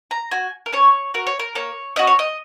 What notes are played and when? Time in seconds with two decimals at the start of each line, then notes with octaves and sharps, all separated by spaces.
0.11 A#5
0.31 F#4 G#5
0.66 A#4
0.73 C#4 C#5
1.14 F#4 A#4
1.27 C#5
1.39 A#4
1.55 A#3 C#5
1.96 C#4 F#4 D#5
2.07 C#5
2.19 D#5